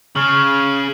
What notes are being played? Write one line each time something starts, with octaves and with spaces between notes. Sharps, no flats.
C#3 C#6 F6 F#7